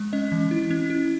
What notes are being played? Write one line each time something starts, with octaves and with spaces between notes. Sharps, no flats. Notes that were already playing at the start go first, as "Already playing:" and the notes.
Already playing: G#3
C#4 D#5
E3
E4
C#4
E4